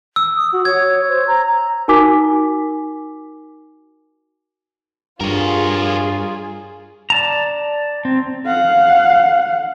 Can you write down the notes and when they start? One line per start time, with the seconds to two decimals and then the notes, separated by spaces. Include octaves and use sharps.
0.16 E6
0.36 D#6
0.52 F#4
0.65 C#5 G#6
1.08 C5
1.27 A#5
1.88 D#4 F#4 A#4 G#5 D6 B6
5.21 G2 F4 G#4 A#4 C#5
7.10 D5 A5 A#5
8.05 C4
8.46 F5 F#5